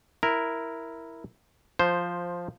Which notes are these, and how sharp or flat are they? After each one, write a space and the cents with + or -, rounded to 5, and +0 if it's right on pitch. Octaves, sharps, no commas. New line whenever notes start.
E4 +0 A#4 +0
F3 +5 C5 +0